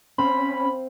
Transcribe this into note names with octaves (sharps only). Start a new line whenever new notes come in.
C4 C#4 C5 F5 B5